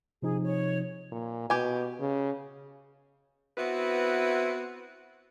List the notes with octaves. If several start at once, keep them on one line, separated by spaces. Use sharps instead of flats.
C3 F3 D#4 G#4
C#5
A#2
B2 G4 G#5
C#3
B3 C4 E4 F#4 B4